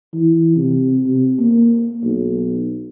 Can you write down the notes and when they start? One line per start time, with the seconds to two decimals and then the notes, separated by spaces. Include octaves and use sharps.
0.14 E3
0.56 C3
1.07 C3
1.39 A#3
2.04 B1